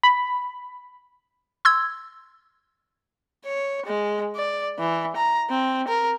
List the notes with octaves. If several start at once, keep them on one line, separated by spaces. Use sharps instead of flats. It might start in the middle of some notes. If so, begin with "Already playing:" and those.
B5
C6 E6 G#6
C#5
G#3
D5
E3
A#5
C4
A#4